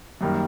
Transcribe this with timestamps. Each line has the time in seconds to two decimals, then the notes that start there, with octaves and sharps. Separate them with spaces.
0.21 F#2 D#3 G3 A#3